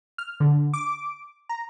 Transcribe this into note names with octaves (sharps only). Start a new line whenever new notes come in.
F6
D3
D6
A#5